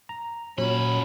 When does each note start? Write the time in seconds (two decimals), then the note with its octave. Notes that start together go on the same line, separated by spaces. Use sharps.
0.09 A#5
0.58 F#2 A#2 F#3 C#4 B5